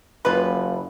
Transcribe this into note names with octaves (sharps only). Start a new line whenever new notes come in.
F#1 F4 B4